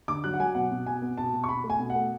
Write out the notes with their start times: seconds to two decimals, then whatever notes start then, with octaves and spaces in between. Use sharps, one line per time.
0.08 D3 D6
0.24 F#3 F#6
0.33 F#5
0.40 F#3 G#5
0.55 B2 F#5
0.71 B2
0.86 B2 G#5
1.02 B3
1.17 B2 A5
1.33 B2
1.44 C#6
1.49 B2 B5
1.64 A3
1.70 G#5
1.79 B2
1.90 F#5
1.95 A3